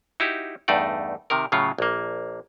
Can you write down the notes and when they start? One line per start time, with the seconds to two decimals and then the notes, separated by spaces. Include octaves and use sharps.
0.20 D#4 E4 F#4 G4
0.68 E2 G2 A3 D#4 D5
1.30 C3 D#3 A#4
1.52 A2 C#3 F#3 F4
1.78 A#1 A#3